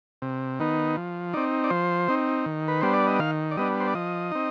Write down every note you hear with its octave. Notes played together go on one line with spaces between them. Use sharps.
C3
D#3 B3 D#4
F3
C4 D#4 D5
D5
F3 C5
C4 D#4
D#3
B4
G3 B3 D4 C5
D5
D#5
D#3 F5
D5
G3 B3 D4 D#5
C5
D5
F3 D#5
C4 D#4